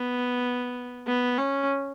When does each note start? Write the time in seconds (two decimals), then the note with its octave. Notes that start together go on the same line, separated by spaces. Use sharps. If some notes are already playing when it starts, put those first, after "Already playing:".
Already playing: B3
1.07 B3
1.38 C#4